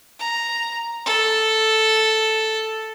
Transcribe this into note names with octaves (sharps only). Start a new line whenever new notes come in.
A#5
A4